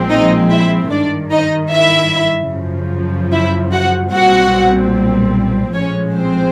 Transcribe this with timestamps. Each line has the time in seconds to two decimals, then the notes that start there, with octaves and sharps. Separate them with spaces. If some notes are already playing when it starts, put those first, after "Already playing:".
Already playing: A#1 A#2 F3 G#3 C4
0.10 D#4 D#5
0.50 E4 E5
0.91 G#1 G2 D#3 D4 D5
1.31 D#4 D#5
1.71 E4 E5
2.52 F#2 C#3 F3
3.32 E4 E5
3.72 F#4 F#5
4.13 B1 A#2 G3 C4 F#4 F#5
5.74 A#1 A2 F3 G#3 C#4 C#5
6.14 C4 C5